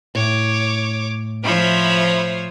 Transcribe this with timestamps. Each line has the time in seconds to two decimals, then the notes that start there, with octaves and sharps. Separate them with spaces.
0.15 A2 C#5 D6
1.44 F3 C5 C#5 E5 B5